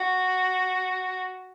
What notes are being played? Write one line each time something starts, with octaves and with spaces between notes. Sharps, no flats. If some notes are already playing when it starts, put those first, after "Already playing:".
Already playing: F#4